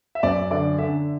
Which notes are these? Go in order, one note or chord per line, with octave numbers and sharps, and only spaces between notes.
E5
F#2 D5
D3 D5
D3 E5